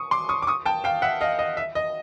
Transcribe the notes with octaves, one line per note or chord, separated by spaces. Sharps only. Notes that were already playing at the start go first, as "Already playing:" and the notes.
Already playing: C#6 D#6
C6 D6
C#6 D#6
D6
C#6 D#6
G5 A5
F5 G5
E5 F#5
D#5 F5
D#5
E5
D#5